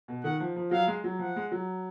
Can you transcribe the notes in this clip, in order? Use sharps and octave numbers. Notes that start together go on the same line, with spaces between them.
B2
D#3 F#5
F3
F3
F#3 F5
G#3
F#3
F3 F#5
G#3
F#3